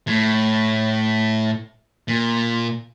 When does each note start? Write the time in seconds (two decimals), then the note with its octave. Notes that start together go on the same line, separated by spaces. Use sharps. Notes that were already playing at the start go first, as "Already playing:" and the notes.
0.07 A2
2.08 A#2